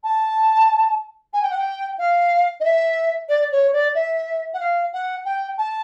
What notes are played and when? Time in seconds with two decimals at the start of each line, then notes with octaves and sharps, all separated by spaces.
0.03 A5
1.33 G#5
1.42 G5
1.50 F#5
1.57 G5
1.98 F5
2.60 D#5
2.64 E5
3.29 D5
3.51 C#5
3.72 D5
3.94 E5
4.53 F#5
4.60 F5
4.92 F#5
5.25 G5
5.57 A5